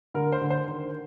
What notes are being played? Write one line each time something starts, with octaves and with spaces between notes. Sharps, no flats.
D3 A#4
C5
D3
C5
D#3